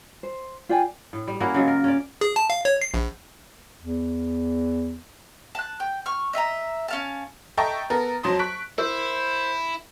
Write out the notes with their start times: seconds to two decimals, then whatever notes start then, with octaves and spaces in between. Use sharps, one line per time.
0.23 C5
0.69 F4 D5 G5 G#5
1.13 A2
1.28 G3
1.40 A#3 C#4 E4 F#4
1.54 C#3 F#3 G#3 F4
1.68 A#4
1.84 C#4 D5
2.21 G#4
2.36 A5
2.50 F5
2.65 C#5
2.81 C7
2.94 A#1
3.79 E2
5.55 A5 F#6
5.80 G5
6.06 C#6 F6
6.33 D#5 E5 G#5 A#5
6.88 C#4 F5 A5
7.57 A4 D#5 E5 G5 A#5 C#6
7.90 B3 A4 A#4
8.23 F2 F#3 A5 C6 D#6
8.39 C#6 F#6 B6 D7
8.78 E4 A#4 C5